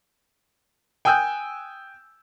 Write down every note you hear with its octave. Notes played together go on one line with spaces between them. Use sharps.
G5 G#5 D#6 E6 F#6 G6